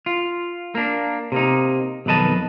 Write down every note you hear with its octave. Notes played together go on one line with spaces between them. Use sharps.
F4
A#3 D4
C3 A#3 D#4
B1 F2 D#3 B4 D#5 A5